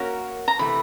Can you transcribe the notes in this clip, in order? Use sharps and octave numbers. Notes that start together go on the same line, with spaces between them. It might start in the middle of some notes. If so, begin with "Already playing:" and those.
Already playing: A#3 C#4 F#4 A#4 C#5
A#5
C3 E3 A3 B5